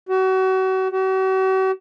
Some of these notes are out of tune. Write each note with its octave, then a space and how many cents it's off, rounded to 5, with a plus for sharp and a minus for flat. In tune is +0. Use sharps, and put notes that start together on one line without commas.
F#4 +35
F#4 +45